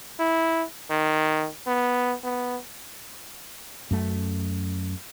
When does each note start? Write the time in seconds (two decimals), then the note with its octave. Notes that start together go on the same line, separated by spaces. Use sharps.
0.20 E4
0.90 D#3
1.67 B3
2.24 B3
3.91 F#2 A3